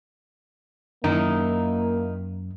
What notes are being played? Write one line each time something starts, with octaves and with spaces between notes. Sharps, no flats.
F#2 D#3 A#3 D#4 E4